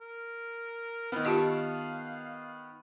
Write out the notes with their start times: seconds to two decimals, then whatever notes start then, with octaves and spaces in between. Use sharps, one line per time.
0.01 A#4
1.12 D#3 B3 C4 A#4 F6
1.25 F4 G4 C#5 D#5 F5 A5 C#6